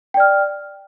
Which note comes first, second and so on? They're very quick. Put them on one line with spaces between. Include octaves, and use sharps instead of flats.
G5 D5 F6